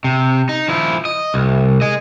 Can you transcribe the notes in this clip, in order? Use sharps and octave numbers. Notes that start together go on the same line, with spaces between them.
C3
D#4
F3 E4
D#5
C2
G#4 D#5